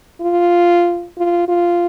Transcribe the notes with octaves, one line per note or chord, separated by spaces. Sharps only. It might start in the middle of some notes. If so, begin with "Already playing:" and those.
F4
F4
F4